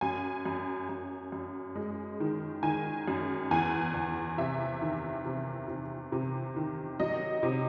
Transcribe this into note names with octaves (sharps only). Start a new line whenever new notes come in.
F#2 G#5
F#2
F#2
F#2
G#3
D#3
D#3 G#5
F#2
E2 G#5
E2
C3 E5
D#3
C3
C3
C3
D#3
F#3 D#5
C3